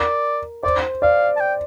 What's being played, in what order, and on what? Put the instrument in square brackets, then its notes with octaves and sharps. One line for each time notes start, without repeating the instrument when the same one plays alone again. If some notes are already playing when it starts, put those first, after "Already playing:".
Already playing: [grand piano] A#4 [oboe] D5
[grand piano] C5 [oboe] D5
[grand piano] D5 [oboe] F5
[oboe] A5
G5